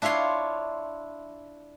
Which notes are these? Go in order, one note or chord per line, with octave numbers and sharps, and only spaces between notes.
D4 E4 F4 C#5 C6